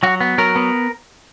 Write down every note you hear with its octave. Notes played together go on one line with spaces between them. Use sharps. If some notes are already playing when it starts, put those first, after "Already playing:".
F#3 F#4
B3
F#3 A#4
B3